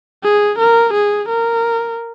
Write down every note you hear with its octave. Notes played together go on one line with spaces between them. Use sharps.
G#4
A#4
G#4
A#4